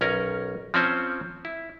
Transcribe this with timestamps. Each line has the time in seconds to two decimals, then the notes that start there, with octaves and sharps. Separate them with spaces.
0.01 B1 C#4 A#4
0.74 F3 C4 C#4 C5
1.45 E4